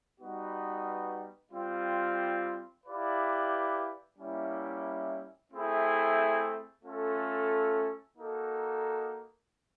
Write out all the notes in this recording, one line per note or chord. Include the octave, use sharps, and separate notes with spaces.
G3 B3 D#4 F#4 B4
G3 C4 F4
E4 G4 B4 D5 F5
G3 A#3 C#4 E4
A3 C4 E4 G#4
A3 C#4 F4 A4
A#3 D#4 F#4 A4